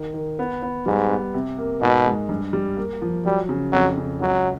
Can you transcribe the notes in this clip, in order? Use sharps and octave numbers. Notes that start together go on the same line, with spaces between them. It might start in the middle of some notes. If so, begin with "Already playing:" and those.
Already playing: D#3
D#3
B3
B3
G#2 G3
B3
C3
A#3
G#2 B2
G#3
G2
G3
A#3
F3
F#3 G3
C#3
F2 F#3
C#3
C#2 F#3